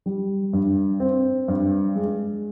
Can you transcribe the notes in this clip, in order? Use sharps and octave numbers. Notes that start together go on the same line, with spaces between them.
G3
G2
C4
G2
G#3